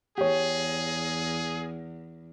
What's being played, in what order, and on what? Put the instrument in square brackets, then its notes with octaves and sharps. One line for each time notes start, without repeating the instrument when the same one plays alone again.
[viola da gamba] E2 [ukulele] G4 C#5 [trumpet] G#4